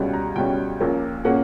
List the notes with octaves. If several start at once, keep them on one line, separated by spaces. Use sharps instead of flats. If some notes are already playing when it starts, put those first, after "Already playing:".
Already playing: C#2 B2 G3 C#4
A#5
C#2 B2 G3 C#4 G5
A#1 A#2 A#3 C#4
A#2 A#3 C#4 F#5